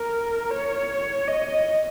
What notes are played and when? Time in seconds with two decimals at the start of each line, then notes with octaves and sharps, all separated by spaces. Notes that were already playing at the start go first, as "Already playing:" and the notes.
Already playing: A#4
0.51 C#5
1.28 D#5